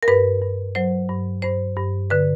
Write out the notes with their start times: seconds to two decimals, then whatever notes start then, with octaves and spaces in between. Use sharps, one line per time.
0.03 A#4
0.08 G2 B4
0.42 G2
0.75 F#3 C5
1.10 G2
1.42 G2 C5
1.76 G2
2.10 D3 B4